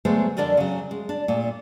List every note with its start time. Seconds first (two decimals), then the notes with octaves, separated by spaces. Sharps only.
0.05 D3 F#3 G#3 A3 B3 C5
0.37 F2 D3 D4 A#4 D5 D#5
0.57 C#3 F#3
0.91 G#3
1.09 D4
1.28 A#2 A3